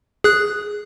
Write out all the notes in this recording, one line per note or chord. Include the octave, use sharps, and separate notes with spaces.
G#4 F#6